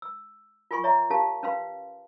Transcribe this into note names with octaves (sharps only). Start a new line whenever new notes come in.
E6
F4 A#4 G#5 C6 C#6
C#5 E5 A#5
C#4 G4 A#4 F5 A5
C#4 B4 F5 C6